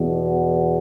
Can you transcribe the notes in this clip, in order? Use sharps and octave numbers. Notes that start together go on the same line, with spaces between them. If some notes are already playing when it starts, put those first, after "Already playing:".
Already playing: E2 B2